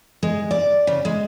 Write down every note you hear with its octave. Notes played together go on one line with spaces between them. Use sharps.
G#3
D5
C#3
G#3